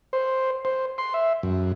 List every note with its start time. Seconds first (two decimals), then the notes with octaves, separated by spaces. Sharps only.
0.13 C5
0.65 C5
0.98 C6
1.14 E5
1.43 F#2